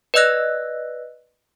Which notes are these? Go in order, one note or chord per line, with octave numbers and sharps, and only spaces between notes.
B4 D5 D#5 E6 F#6 A#6